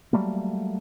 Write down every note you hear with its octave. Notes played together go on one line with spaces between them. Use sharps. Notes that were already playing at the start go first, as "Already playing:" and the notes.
F#3 G3 A3 A#3